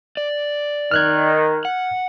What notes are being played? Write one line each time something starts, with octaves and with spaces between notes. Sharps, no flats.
D5
D#3 F6 F#6 G#6
F#5